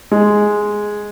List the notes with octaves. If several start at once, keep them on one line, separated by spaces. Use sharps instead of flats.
G#3